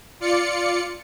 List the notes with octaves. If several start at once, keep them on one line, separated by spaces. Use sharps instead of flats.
F4 D5 C#7